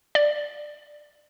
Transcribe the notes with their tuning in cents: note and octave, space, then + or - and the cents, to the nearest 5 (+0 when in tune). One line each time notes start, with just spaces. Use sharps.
D5 +15